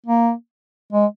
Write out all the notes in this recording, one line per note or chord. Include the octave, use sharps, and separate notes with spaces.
A#3
G#3